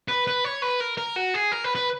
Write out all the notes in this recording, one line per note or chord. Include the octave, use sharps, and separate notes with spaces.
B4
B4
C#5
B4
A#4
A#4
F#4
G#4
A#4
B4
B4